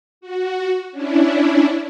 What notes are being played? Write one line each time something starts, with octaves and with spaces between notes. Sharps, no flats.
F#4
C#4 D4 E4